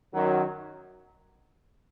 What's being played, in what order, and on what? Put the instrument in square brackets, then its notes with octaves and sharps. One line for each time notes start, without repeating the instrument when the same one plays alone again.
[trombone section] F#2 D#3 F#3